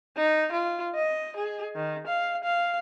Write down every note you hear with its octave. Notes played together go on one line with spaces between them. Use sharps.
D#4
F4
D#5
G#4
D#3
F5
F5